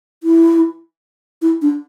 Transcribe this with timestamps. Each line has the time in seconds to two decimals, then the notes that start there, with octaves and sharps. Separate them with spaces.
0.23 E4
1.42 E4
1.62 D4